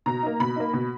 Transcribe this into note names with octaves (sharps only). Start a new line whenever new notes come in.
B2 A#5
A#3 D#4
B2 B5
A#3 D#4
B2